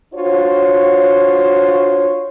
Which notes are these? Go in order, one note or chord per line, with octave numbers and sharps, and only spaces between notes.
D4 F4 F#4 C5 C#5